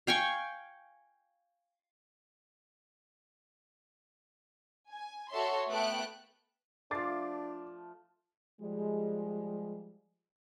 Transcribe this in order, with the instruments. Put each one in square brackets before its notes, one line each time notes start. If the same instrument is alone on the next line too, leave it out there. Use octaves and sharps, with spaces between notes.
[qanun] F5 G5 G#5 C#6
[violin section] G#5
F#4 A4 C#5 E5 C6
A3 B3 G5 F#6 D7
[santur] F3 A3 [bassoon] D4 [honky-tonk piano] D6 A6 C7
[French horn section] F3 G3 G#3